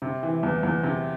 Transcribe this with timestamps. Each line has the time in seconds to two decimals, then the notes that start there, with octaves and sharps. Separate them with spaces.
0.02 C3
0.23 E3
0.43 E2
0.63 E2
0.83 C3